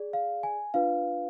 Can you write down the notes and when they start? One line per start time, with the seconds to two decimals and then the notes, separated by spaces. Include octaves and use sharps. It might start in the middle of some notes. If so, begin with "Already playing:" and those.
Already playing: G#4 D5
0.13 F5
0.43 G#5
0.74 D4 F4 B4 F5